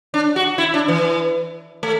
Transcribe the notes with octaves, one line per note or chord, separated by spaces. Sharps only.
D4
F#4
E4
D4
E3
A3